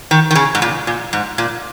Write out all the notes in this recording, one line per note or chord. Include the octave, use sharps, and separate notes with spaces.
D#3
D#3
C#3
G#2
A#2
A#2
G#2
A#2